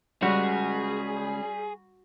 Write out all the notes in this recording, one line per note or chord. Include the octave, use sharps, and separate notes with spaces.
G3 G#3 C#4 F#4 G#4